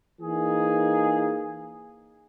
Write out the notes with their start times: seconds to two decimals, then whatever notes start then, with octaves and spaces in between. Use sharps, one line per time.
0.21 E3 A#3 D#4 G#4